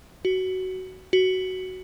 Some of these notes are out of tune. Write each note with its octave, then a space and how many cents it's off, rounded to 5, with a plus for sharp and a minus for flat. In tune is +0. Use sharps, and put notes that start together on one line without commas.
F#4 +15
F#4 +10